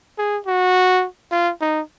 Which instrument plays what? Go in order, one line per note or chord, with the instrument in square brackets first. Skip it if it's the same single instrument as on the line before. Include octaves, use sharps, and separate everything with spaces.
[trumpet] G#4
F#4
F4
D#4